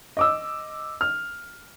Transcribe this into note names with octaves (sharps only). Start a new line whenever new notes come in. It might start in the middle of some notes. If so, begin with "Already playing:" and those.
D#5 D6 E6
F6